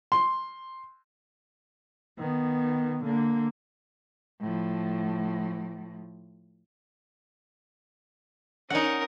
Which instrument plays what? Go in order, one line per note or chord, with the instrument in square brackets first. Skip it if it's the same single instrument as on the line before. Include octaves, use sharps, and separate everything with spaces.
[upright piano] C6
[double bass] D#3 B3
D3 A#3
[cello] A2 F3
[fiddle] C#4 A#4 [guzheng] D#4 F#5